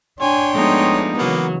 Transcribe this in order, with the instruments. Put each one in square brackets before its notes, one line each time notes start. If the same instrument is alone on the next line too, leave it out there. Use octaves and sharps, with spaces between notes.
[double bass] D4 [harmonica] C#5 G5 C6 [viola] G#5
[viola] F3 A3 [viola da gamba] G#3 B3 D#4
[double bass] C#3 E3 [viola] F#3 [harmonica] A#3 B3